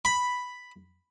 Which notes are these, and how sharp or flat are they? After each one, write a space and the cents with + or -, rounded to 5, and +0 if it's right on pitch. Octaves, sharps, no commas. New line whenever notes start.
B5 +0